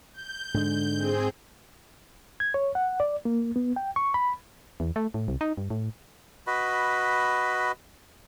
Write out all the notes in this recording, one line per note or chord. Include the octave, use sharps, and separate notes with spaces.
G6
G#2 D3 G#3
C4 G#4
G#6
C#5
F#5
D5
A#3
B3
G5
C#6
B5
E2
A3
A2
C2
D#4
G2
A2
F#4 B4 D#5 B5